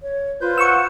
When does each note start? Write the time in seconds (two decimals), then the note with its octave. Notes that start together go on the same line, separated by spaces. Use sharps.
0.02 C#5
0.41 F4 B4 C5 G6
0.58 F#5 C#6 E6